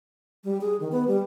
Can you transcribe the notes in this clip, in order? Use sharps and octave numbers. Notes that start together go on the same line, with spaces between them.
G3
G#4
D#3
B3
G3